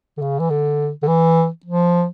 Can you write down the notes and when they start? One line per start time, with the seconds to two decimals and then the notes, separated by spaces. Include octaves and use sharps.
0.17 D3
0.22 C#3
0.39 E3
0.50 D3
1.03 D3
1.07 E3
1.66 F3